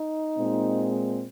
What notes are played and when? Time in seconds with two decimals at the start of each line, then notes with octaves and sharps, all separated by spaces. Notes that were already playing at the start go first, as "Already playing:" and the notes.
Already playing: D#4
0.37 A#2 G#3 C4